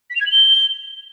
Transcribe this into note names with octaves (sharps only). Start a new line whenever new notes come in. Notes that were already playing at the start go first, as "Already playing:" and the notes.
B6
F7
G#6
F#7
G7